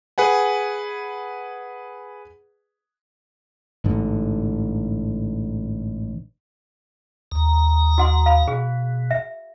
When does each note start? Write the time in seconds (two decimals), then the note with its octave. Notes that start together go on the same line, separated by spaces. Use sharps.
0.18 G#4 B4 F#5 G#5
3.84 A1 G#2 D3
7.32 D#2 A#5
7.98 F#4 F#5 C6
8.26 F5 B5
8.48 B2 G#4
9.11 E5